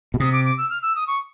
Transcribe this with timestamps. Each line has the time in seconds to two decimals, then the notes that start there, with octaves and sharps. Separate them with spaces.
0.14 B2
0.20 C3 D#6
0.32 D6
0.45 D6
0.57 E6
0.70 F6
0.82 E6
0.95 D#6
1.07 C#6